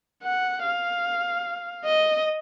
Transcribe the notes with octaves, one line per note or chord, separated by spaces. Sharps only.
F#5
F5
D#5